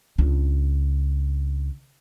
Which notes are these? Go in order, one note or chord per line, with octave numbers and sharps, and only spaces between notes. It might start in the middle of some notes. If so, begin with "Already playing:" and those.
C#2 D4